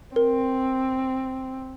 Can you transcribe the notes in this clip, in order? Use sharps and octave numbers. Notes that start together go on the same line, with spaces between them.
C4 A#4